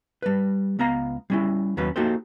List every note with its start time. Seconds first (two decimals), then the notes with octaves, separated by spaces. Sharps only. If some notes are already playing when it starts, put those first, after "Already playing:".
0.22 G3 B4
0.79 C#2 B3 F5 A#5
1.30 G3 C#4 E4
1.77 D#2 F#3 C#4 B4
1.96 A#3 D#4 F#4 G4 A4 C5